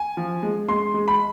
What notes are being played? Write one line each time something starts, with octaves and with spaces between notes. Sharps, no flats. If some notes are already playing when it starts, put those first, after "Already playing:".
Already playing: G#5
F3
G#3
G#3 C6
G#3
B5